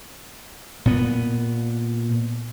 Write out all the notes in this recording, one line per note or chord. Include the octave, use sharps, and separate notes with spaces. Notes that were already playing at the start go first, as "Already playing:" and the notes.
A#2 B3